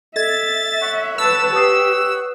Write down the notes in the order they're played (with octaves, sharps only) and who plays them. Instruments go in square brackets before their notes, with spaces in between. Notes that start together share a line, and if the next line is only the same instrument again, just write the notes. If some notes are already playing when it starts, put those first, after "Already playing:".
[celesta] A4 D#5 G#6 [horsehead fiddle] E5 [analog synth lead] A6
[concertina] C#5 F#5
[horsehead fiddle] B4 A5 [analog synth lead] E6
[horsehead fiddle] G4 [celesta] B4 D#6 C7